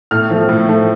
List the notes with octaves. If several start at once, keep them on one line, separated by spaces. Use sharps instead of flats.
A2 F6
F3 A3
A2
F3 A3